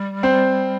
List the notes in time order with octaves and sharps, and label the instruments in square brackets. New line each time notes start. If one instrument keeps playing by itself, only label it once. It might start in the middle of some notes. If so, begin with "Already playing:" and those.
Already playing: [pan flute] G3
[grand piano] C4 C5